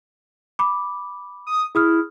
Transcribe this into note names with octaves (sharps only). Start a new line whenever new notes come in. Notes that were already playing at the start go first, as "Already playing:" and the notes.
B5 D6
D#6
E4 G#4 D#6 F6